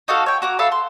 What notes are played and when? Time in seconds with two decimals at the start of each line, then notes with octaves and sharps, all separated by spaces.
0.08 D#4 F#4 A4 F5
0.26 C#5 G5
0.42 F#4 A#5 D6
0.59 A4 E5 F5 B5
0.72 C6